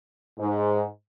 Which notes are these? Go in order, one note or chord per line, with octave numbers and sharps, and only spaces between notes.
G#2